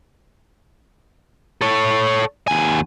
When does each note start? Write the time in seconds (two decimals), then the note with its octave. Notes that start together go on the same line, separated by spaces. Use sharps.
1.61 A4 C#5
2.48 D#2 G#5